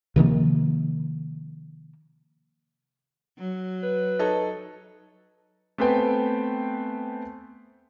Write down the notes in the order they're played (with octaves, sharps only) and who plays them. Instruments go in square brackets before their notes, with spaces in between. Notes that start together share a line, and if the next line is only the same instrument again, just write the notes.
[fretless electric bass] C3 D#3 F3 A#3
[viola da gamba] F#3
[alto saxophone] B4
[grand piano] D#4 A4 C#5
A3 B3 C4 B4 G5 G#5